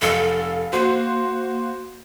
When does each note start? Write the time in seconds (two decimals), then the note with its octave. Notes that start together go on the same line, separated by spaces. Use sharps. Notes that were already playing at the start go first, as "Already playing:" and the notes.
0.02 F1 A4 F5
0.73 A#3 F#4 C5